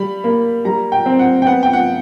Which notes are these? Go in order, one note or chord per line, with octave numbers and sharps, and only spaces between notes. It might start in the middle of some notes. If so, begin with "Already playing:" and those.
Already playing: G3 B5
A#3
G3 A#5
G5
C4
F#5
G5
B3 F#5
G5
F#5